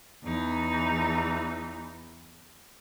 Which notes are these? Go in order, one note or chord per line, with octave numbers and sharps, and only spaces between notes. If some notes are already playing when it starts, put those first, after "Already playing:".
E2 E3 D#4